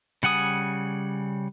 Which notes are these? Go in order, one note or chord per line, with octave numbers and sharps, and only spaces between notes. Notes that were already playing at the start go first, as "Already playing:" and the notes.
C#3 G3 F#5 G#5 D#6